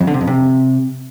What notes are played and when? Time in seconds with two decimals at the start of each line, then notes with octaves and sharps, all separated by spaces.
0.01 F2
0.07 D3
0.14 C3
0.21 F2
0.27 C3